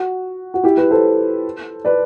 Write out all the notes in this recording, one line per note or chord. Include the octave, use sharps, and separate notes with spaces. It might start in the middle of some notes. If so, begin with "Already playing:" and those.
Already playing: F#4
F#4
E4 G4
G4 B4
A4 C5
B4 D5